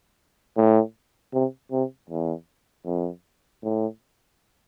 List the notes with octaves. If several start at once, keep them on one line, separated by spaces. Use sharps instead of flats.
A2
C3
C3
E2
F2
A2